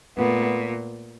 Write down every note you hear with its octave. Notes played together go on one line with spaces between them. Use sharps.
A#2 A3 B3